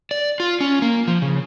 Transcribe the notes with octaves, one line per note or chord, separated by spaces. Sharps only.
D5
F4
C#4
A#3
F3
C#3